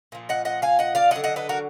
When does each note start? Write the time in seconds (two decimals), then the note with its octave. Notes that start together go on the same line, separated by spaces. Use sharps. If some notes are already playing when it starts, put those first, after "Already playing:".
0.12 A#2 F3
0.29 D#5 F#5
0.45 D#5 F#5
0.62 F5 G#5
0.79 D#5 F#5
0.95 D5 F5
1.11 D3 F#3 D#5 F#5
1.24 D#5 F#5
1.36 B4 D#5
1.49 F#4 A#4